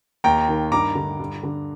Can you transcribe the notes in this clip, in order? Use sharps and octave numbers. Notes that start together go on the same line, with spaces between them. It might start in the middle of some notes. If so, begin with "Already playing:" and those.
D#2 G5 A#5
D#3
G2 A#5 D6
D3
G2
D3